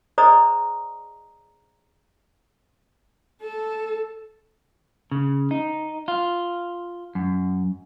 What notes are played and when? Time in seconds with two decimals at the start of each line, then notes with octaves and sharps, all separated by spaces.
0.18 G#4 C5 D5 D#5 A#5 D#6
3.42 A4
5.12 C#3
5.51 D#4
6.08 F4
7.15 F#2